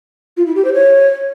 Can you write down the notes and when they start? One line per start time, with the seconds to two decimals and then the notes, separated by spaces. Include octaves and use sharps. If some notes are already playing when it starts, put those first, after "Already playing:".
0.37 F4
0.46 E4
0.55 G4
0.65 C5
0.74 C#5